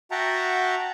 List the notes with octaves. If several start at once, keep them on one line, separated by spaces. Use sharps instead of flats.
F#4 E5 F#5 G5 A5 A#5